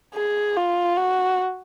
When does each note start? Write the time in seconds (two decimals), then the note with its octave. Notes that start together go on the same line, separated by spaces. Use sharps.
0.15 G#4
0.57 F4
0.97 F#4